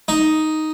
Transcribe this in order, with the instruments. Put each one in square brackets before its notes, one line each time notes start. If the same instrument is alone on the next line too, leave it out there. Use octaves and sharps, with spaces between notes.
[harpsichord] D#4